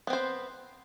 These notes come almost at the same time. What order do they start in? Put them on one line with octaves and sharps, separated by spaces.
B3 C4 C5